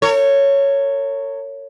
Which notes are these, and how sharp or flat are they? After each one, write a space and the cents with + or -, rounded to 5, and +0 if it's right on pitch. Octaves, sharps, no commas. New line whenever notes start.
A#4 -45 C#5 +0